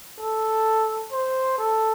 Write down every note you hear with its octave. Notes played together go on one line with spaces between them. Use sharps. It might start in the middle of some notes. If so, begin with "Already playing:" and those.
A4
C5
A4